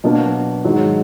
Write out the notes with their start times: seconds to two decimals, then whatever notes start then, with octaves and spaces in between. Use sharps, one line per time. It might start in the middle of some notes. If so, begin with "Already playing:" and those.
0.04 B2 F#3 A#3 D4
0.64 G#2 D#3 F#3